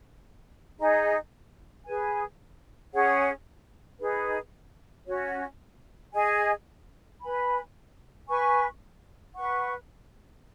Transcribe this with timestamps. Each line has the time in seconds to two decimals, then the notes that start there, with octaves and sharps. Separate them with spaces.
0.79 D#4 G#4 D#5
1.86 G#4 B4 G#5
2.93 C#4 G#4 C#5 F#5
4.00 D#4 G#4 B4
5.07 C#4 F#4 C#5
6.14 G#4 D#5 G#5
7.22 B4 G#5 B5
8.29 B4 G#5 C#6
9.36 B4 F#5 C#6